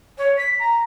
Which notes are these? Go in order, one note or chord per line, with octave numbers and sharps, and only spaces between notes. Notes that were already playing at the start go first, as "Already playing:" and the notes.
C#5
B6
A#5